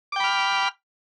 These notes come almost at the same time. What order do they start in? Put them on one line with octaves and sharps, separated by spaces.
D6 G5 B5 F6